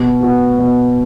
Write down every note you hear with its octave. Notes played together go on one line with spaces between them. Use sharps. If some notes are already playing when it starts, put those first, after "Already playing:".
Already playing: B2
B3 F#4
B2